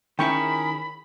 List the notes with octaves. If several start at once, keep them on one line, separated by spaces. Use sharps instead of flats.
D#3 C#4 E4 G#4 A#4 G5 B5 C#6